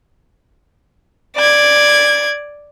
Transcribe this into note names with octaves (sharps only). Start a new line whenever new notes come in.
D5 G#6